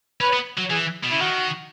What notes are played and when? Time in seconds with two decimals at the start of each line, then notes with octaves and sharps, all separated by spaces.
0.21 C#4 B4
0.33 B3
0.58 F#3
0.70 E3 G#4
1.04 B2
1.11 C#3 E4
1.19 D#3 F#4